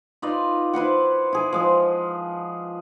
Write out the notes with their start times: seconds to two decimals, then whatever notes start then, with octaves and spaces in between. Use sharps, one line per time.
0.22 D#4 F4 B4 D5
0.73 E4 B4 C5 F#5
1.33 E4 G#4 B4
1.52 F3 G#3 G#4